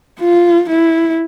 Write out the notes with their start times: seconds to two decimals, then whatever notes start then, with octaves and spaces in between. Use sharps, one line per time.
0.20 F4
0.70 E4